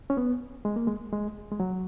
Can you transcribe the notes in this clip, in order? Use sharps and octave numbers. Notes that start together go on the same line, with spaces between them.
C#4
B3
G#3
A#3
G#3
G#3
G#3
F#3